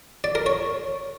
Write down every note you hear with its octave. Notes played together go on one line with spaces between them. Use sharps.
D5
A#4
C#5